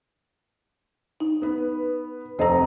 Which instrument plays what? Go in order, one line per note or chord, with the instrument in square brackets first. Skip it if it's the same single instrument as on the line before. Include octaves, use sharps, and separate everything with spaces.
[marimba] D#4
[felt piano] B3 B4
[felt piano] F1 A4 A#5 [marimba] D#2 C5 D#5